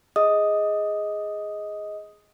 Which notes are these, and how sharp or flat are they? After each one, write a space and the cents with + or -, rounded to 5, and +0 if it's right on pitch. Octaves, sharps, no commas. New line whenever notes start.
G#4 +0 D#5 +15 D#6 +0